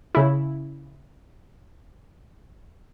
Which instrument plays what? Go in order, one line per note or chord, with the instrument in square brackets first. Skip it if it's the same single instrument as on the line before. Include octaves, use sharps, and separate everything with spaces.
[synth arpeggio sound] C#3 E4